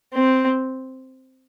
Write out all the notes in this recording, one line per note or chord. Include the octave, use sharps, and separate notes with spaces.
C4